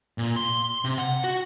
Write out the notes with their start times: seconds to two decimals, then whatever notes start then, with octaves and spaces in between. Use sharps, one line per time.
0.18 A#2
0.36 C6
0.84 C3
0.98 F#5
1.24 F#4